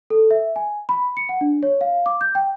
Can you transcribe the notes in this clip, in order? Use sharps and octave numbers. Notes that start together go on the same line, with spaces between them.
A4
E5
G#5
B5
C#7
F#5
D4
C#5
F5
D6
G6
G5